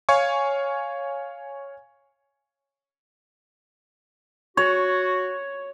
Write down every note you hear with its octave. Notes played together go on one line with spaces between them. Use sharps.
C#5 F5 G#5 C#6
F#4 C#5